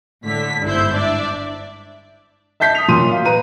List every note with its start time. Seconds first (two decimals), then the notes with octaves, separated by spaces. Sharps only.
0.25 A2 D3 B6
0.63 G1 G#2 E4 C5 G6
0.93 D4 D5 E5
2.60 E5 A5 G6 B6
2.75 D#6 F7
2.88 A#2 F#3 C6 D#7
3.12 F5
3.25 B4 A#5 D#7